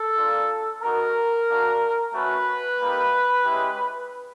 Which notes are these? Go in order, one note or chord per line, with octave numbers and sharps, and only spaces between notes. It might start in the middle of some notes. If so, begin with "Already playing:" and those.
Already playing: A4
A#3 D4 F4
B3 D#4 F#4 A#4
A#3 D4 F#4
A3 C#4 F#4 B4
G3 A#3 D#4 G4
G#3 C#4 E4 G4